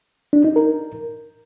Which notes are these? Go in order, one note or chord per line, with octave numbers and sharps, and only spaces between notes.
D4
D#4
A#4